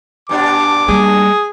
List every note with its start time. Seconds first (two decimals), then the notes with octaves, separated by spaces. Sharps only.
0.29 G2 A#2 D4 D6
0.88 G3 A#3 G#4